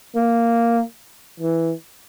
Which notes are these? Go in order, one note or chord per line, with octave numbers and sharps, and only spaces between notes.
A#3
E3